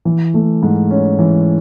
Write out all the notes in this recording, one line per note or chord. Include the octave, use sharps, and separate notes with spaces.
E3
A3
G#2
C#4
E3